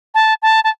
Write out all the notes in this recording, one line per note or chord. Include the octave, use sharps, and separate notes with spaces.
A5
A5
A5